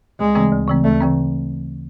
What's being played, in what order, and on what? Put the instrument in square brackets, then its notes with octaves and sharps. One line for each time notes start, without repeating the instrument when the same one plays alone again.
[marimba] D2 [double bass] G#3
[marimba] C#3 E3 A3 C4
D2
C#3 E3 A3 C4
[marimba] D2 [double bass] A3
[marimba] C#3 E3 A3 C4